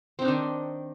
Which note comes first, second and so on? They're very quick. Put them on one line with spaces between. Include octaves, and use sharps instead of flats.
C4 D#4 D4 D#3